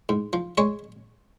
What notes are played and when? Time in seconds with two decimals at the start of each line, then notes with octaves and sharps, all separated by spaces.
0.09 G#2
0.33 F3
0.58 G#3 C#5